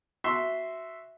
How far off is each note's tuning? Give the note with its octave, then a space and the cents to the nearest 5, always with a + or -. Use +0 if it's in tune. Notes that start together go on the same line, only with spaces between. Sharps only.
F#4 +0 E5 +0 C6 -5